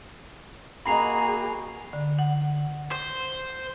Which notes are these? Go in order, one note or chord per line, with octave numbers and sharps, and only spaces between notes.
A#3 F#4 G#4 D#5 A#5 B5 C7 F7
D3
F#5
C5